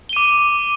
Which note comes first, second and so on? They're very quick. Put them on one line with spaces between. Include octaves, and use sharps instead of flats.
G7 D#7 D6